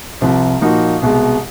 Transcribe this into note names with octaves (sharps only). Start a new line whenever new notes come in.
C2 C3 F3
A#2 F3 A#3 D#4 F#4
C2 B2 G#3